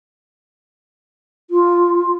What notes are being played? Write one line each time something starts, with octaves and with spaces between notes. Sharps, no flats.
F4